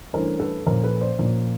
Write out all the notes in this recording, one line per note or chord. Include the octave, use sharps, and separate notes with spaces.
G2 E3 A3 C#4 A#4 C5
A4 B4
A#2 F3 A#3 C#4 A#4 C5
A4 B4
C5 D5
A#2 F3 A#3 C#4